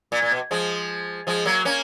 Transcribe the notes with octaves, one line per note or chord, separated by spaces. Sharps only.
A#2
A#2
B2
F3 G#3
F3 G#3
F#3 A#3
A#3 C#4